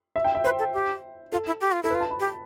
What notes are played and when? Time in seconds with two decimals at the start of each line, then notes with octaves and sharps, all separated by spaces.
0.16 E5
0.25 G5
0.35 E5
0.44 B4 C5
0.59 A4
0.74 G4
1.32 F4 A4
1.47 E4
1.61 G4
1.72 F4
1.83 E4 A4
1.90 B4
1.94 F4
2.00 A5
2.11 B5
2.20 G4